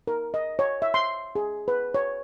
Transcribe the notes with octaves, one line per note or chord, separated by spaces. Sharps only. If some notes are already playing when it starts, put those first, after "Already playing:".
A#4
D#5
C#5
E5
C6
G#4
B4
C#5